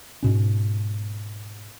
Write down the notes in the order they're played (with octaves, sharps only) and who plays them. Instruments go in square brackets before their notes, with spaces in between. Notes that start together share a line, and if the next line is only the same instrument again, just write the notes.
[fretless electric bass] G#2 B2 C#4